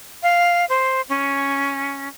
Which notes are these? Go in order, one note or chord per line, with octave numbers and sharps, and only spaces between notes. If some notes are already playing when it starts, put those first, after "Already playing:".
F5
C5
C#4